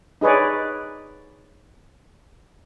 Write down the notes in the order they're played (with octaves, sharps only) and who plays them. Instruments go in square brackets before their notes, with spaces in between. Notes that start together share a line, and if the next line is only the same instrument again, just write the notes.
[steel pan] D#4 G#4 B4 C#5 D5